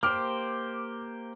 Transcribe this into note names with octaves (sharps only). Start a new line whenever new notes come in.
A#3 G4 C5 D6 F6